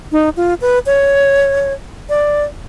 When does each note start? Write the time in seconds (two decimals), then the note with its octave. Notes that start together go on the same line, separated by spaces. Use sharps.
0.12 D#4
0.37 F4
0.61 B4
0.86 C#5
2.09 D5